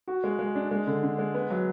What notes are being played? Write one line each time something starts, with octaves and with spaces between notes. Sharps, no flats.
F#4
G#3
G#3
D4
G#3
D3
D3
G#3
B3
F#3